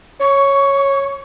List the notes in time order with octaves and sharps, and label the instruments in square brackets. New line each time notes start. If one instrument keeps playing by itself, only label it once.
[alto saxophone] C#5 [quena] C#6